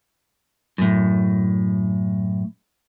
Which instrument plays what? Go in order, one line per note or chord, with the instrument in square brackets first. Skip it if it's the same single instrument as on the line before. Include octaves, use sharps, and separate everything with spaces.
[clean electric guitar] F#2 A2